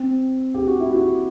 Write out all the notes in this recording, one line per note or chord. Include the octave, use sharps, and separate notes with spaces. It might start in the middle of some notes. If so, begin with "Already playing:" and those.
Already playing: C4
G4
F#4
E4
F#4